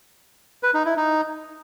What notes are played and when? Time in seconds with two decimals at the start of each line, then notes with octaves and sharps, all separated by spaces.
0.63 B4
0.74 D#4
0.85 E4
0.97 D#4